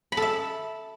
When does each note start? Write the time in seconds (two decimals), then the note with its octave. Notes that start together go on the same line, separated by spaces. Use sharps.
0.12 B5
0.17 A4
0.22 E5